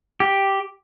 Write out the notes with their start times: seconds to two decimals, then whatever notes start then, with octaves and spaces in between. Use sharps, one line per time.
0.20 G4